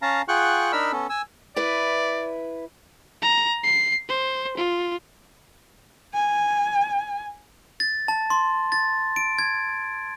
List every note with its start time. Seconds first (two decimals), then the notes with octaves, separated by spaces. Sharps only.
0.02 C#4 F5 A5 A#5
0.28 F4 G#4 F#5 G5 C#6 F#6
0.72 D4 D#4 A#4 B5 E6 F6
0.92 B3 C#4 A4
1.10 G#5 E6
1.56 E4 B4 D5
3.22 A#5
3.64 C7
4.09 C5
4.57 F4
6.14 G#5
7.80 A6
8.08 A5
8.30 C6
8.72 A6
9.16 D7
9.39 G#6